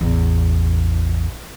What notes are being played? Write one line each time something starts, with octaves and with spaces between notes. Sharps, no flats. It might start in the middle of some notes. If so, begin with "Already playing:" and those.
A1 E2